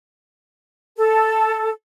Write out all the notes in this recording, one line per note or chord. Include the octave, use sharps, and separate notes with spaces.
A4